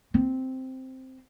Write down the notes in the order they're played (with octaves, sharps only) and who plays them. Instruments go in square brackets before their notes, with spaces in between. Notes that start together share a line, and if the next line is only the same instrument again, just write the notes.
[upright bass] C4